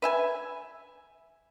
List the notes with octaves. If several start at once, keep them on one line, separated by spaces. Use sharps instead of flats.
B4 E5 G#5